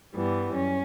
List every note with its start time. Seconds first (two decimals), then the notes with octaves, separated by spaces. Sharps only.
0.14 G2 E3 G3 B3
0.54 F#2 C#4